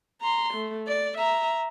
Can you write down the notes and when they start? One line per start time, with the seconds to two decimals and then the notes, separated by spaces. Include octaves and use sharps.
0.21 A#5 C6
0.54 A3
0.87 D5
1.18 E5 A#5